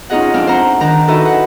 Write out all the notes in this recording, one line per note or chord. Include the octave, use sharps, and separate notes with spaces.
C#4 D#4 F4 G#4 D#5 F#5
F2 D4 F6
C5 F#5 A#5
D#3 D4 A#5
D#4 E4 F#4 A4 B4 D#5
F#5